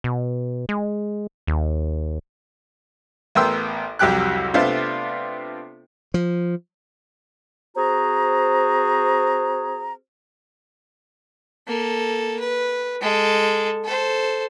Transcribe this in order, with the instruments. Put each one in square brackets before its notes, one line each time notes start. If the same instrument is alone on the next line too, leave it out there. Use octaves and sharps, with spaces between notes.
[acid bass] B2
G#3
D#2
[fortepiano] A1 B3 A#4 G5 C6 E6
C2 F2 F#3 G4 G5 F#6
C3 A3 B3 D4 F4 C5
[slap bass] F3
[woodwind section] C4 F#4 G#4 C5 A#5
[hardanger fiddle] A#3 A4
B4
G#3 A4
A4 C5